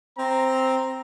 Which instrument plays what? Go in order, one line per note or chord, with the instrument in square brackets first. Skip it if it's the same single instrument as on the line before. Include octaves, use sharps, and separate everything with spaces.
[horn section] C4 A#5